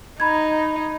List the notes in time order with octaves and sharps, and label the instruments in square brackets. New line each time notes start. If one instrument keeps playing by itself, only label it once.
[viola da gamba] D#4 [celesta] A#5 B5 G#6